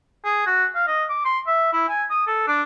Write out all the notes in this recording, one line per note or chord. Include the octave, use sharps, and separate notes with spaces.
G#4
F#4
F5
D#5
D6
C6
E5
E4
G#5
D#6
A4
D4